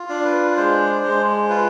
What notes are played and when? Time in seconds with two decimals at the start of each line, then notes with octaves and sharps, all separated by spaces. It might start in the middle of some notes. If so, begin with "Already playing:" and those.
Already playing: F4
0.09 D4
0.25 B4
0.56 G#3 C5
1.03 G#3
1.49 F4 B4